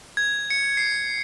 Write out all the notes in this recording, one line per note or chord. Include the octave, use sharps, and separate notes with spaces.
G#6
C#7
C7